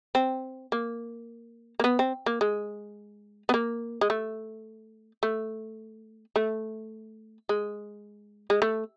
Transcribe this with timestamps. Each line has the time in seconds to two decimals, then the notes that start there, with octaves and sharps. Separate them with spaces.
0.15 C4
0.72 A#3
1.80 A#3
1.84 B3
1.99 C4
2.26 A#3
2.41 G#3
3.49 B3
3.54 A#3
4.01 G#3
4.10 A3
5.23 A3
6.36 A3
7.49 G#3
8.50 G#3
8.62 A3